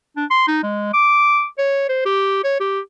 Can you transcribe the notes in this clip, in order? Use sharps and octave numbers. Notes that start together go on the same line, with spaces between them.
D4
C6
D#4
G#3
D6
C#5
C5
G4
C#5
G4